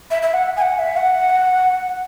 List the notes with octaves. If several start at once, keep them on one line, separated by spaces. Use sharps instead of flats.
E5
E5
F#5
G#5
F#5
E5
F#5